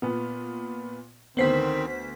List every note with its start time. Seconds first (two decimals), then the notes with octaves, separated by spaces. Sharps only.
0.02 A#2 B3
1.37 D2 D#3 B3 C4 C5 B6 C7 F#7